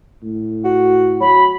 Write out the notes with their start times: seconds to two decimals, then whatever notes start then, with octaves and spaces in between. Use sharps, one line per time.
0.23 A2
0.64 F#4
1.20 F#3 B5